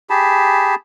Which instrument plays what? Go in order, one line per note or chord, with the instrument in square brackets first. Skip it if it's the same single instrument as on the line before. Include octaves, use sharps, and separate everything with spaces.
[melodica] G4 G#4 A5 B5